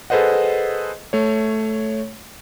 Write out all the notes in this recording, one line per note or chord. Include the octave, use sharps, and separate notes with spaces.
G#4 A4 B4 C5 D#5 F#5
A3 C#5